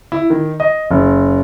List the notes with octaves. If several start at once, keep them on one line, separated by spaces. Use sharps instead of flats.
E4
D#3
D#5
F#1